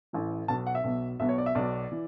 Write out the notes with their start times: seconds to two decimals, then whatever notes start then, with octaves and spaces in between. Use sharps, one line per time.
0.13 A1 A2 E3
0.48 B1 B2 A5
0.67 F#5
0.75 E5
0.84 B1 B2
1.20 B1 B2 E5
1.29 C#5
1.38 D5
1.46 E5
1.55 B1 B2 D5
1.92 E3